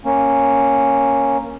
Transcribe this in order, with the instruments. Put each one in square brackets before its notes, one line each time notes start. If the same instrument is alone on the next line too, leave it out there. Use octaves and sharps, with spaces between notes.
[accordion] A#3 C#4